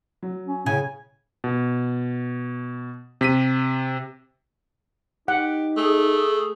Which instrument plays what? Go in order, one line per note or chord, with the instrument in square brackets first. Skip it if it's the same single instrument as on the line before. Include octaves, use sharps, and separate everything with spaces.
[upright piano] F#3
[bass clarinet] C#4
[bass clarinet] A2 [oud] C#3 [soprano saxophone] G#5
[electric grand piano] B2
C3 B6 D#7
[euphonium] D#4 [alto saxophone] G4 [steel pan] F#5
[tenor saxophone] A3 [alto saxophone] G#4